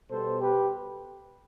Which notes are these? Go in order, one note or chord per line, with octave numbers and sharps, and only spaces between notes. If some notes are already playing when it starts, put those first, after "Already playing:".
B2 G3 B3 A4 C5
G4 B4